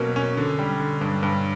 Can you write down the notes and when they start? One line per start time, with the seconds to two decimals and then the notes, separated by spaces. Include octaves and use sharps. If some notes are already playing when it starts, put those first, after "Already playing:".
Already playing: B2 F#3 A#3 C#4
0.16 C#4
0.37 D3
0.59 G3
0.80 D3
1.01 G2
1.23 G2